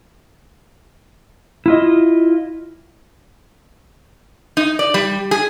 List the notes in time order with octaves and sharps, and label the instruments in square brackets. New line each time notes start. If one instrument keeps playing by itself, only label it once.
[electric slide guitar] E4 F4 D#5
[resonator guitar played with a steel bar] D#4
D5
G3
G#4